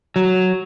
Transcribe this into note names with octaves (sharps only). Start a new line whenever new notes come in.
F#3